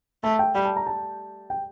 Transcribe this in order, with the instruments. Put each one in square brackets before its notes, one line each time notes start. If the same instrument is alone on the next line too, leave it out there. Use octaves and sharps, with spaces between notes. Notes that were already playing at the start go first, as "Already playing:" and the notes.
[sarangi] A3 [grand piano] A5
[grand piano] G5
[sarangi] G3 [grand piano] G5
[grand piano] A5
A#5
A5
G5